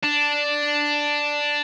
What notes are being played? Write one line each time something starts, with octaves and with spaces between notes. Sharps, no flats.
D4